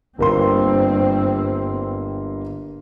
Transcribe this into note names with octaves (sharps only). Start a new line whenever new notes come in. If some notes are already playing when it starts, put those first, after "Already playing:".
G1 G2 A#3 C4 C6